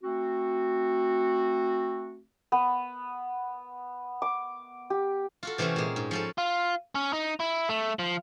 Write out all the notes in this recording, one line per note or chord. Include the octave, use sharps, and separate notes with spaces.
A3 C4 F#4
B3
D6
G4
F4 F#4 A4
C3 E3 A3 C4 C#4
A#2 G#3
G#2
F3 C#4 A4
F4
C#4
D#4
E4
A3
F3